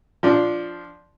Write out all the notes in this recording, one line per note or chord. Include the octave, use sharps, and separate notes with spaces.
F3 D4